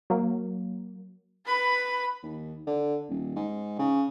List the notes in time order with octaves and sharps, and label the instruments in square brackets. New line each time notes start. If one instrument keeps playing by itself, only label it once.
[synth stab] F#3 A#3
[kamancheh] B4 B5
[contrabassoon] D#2
D3
D#1
G#2
C#3